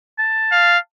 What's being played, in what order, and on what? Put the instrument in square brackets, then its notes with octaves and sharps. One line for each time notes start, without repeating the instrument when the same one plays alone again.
[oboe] A5
[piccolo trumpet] F5